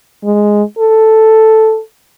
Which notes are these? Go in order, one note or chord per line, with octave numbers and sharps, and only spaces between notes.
G#3
A4